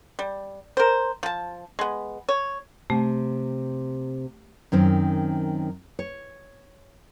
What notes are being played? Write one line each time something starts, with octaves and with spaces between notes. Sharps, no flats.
G3
A#4 C5
F3 A5
G#3 B3
C#5
C3 A3
F#2 D#3 C4
C#5